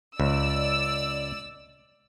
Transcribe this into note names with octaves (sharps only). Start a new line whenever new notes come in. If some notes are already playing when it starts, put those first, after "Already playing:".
C#2 D5 E6